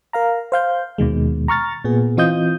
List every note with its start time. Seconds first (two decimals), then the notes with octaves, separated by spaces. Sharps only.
0.13 A#4 F5 A#5
0.52 C5 F5 G6
0.98 D#2 B2 D#3 G#3
1.48 A#5 C#6 F6 A6
1.84 A#2 B3 G#4
2.17 E3 C4 F4 D#5 D#6 G6